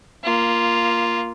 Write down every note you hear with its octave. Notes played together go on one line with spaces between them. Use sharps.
A#3 F4